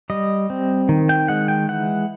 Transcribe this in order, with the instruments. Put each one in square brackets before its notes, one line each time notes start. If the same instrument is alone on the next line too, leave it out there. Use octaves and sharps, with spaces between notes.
[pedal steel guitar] G3 D#5
C4
D#3
G5
G#3 F#5
G5
E3 F#5